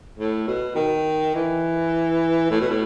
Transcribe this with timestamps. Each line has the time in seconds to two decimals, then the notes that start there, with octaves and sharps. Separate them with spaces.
0.18 A2
0.47 B2
0.75 D#3
1.35 E3
2.51 A2
2.60 B2
2.70 A2